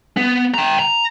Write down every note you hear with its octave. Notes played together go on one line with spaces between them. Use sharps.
B3
G5 A#5
A#5